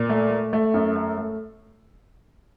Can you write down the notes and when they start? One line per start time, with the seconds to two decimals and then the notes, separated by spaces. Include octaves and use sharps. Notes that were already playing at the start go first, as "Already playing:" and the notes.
Already playing: A#2
0.10 A3
0.31 A3
0.53 A3
0.74 F#2
0.96 A3
1.18 A3